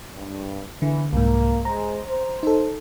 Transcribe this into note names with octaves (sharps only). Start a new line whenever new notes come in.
G2
E2 D3 E3
C2 G#2 A#3
G#3 C5 A#5
C5
D#4 A4